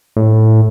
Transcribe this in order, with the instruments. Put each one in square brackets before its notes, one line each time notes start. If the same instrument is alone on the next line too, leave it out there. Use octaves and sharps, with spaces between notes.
[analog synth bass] A2